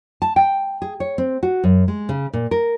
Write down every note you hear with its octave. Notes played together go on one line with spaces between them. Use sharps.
A5
G5
G#4
C#5
C4
F#4
F#2
G#3
C#3
A#2
A#4